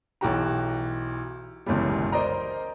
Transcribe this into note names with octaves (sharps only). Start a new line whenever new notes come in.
B1 E3 F#4 G4 A#5
G1 C#2 F#2 B2 E3 G3
A#4 C5 D5 D#5 A#5